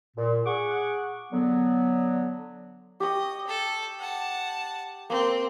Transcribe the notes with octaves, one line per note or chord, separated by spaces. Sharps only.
A#2
G#4 F#5 C#6 D6
D3 F#3 B3
G4 D#5 C#6
A4
F#5 A5
A#3 C4